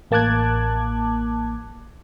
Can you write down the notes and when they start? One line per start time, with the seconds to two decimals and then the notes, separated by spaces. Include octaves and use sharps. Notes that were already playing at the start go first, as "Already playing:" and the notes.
0.11 A1 A#3 A5 D6 F#6 G#6